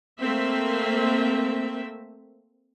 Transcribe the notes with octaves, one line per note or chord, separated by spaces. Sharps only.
A3 A#3 C4 E5